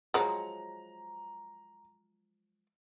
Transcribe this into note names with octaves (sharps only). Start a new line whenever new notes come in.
F3 F#3 G#3 A#5